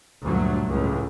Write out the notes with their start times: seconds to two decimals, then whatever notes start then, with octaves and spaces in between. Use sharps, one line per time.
0.23 D2 G2 A#2 F#3 A3
0.67 C#2 A2